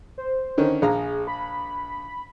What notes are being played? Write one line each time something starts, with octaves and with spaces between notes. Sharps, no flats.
C5
D3 D#3 C#4
A#1 G#4 F5 A#5
B5